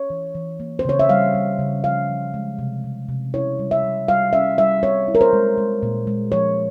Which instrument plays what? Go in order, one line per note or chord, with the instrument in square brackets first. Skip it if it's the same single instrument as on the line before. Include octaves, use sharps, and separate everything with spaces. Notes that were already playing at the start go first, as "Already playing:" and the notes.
Already playing: [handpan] C#5
E3
E3
A#3
C5
C#3 C#5
E5
G3 F5
G3
C#3
F3 F5
F3
G#3
C3
C3
C3
E4 C#5
G3
E5
G3
G3 F5
C#4 E5
G3 E5
C4 C#5
E4
A#4
C5
G#3
G#3
A#2
G#3
F3 C#5